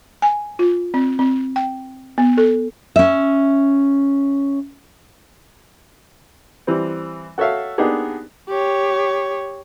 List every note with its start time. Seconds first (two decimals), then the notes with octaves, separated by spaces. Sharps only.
0.22 G#5
0.59 F4
0.94 C4
1.19 C4
1.56 G5
2.18 B3
2.38 A4
2.96 C#4 E5
6.67 E3 G3 C4
7.38 F#4 A4 C#5 E5 F5
7.78 A#3 B3 D4 D#4 G4 G#4
8.49 G4 C#5